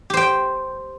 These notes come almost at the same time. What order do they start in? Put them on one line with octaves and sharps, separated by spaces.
G4 C5 G5